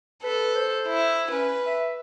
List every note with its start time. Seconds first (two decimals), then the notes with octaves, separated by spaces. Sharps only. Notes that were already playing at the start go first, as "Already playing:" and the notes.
0.24 A4 B4
0.55 C5
0.88 E4
1.32 C#4 B4
1.66 E5